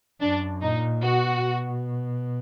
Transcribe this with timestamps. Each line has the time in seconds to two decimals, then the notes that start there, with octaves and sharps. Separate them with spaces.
0.21 F#2 D4
0.62 A#2 D#4
1.02 B2 F#4
1.43 B2